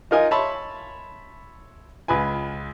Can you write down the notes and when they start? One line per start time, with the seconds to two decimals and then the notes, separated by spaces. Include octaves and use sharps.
0.11 D#4 F4 A#4 D#5 G#5
0.31 C#5 E5 A5 B5 C6
2.08 C#2 F4 B4 G#5